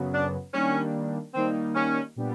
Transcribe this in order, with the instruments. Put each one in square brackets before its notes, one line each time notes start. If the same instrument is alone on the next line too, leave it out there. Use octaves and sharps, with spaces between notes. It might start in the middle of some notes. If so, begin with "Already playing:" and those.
Already playing: [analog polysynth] F#2 C#3 F#3 B3
[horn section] D4
[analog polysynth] D#3 G3 A#3 D4 [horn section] C#4
[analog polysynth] D#3 G3 A#3 D#4 [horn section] C4
[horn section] C#4
[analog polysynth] A#2 G3 B3 D4 G4